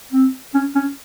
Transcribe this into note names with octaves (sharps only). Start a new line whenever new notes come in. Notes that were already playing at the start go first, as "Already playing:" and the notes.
C4
C#4
C#4